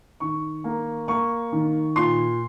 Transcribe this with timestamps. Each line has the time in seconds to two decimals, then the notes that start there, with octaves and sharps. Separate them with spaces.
0.20 D#3 C#6
0.64 A#3
1.08 A#3 C#6
1.52 D#3
1.96 A#2 C6